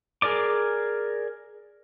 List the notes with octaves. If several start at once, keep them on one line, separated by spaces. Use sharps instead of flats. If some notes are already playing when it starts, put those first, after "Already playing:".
G#4 A#4 D5 D6